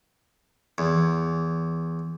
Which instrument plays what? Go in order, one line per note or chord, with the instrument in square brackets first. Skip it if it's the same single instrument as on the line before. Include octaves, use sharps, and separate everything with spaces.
[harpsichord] E2